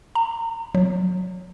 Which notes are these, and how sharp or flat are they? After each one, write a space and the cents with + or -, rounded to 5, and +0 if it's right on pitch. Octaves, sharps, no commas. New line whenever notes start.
A#5 -30
F#3 -20